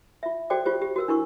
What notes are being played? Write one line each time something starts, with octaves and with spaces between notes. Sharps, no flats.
F4 E5
F#4 A4 C5 D5 G5 D6
F4 G4 C5
G4
F#4 A#4 E6
D4 E4 A#4 C#6